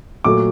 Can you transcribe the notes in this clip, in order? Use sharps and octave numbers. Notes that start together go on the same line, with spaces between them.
A#2 F#3 A3 D6